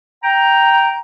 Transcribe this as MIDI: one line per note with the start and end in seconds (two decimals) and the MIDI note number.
0.24 0.98 79
0.24 0.98 82